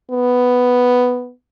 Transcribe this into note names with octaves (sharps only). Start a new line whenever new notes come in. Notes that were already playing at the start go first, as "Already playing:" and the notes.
B3